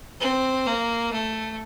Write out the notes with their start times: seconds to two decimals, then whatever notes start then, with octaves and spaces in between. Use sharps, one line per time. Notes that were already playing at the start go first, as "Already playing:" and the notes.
0.21 C4
0.67 A#3
1.12 A3